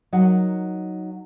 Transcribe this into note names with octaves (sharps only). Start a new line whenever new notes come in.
F#3 D#4 A#4 F#5